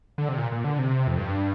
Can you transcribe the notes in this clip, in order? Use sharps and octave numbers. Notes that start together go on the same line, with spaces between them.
D3
C3
A#2
A#2
D3
C3
F2
G2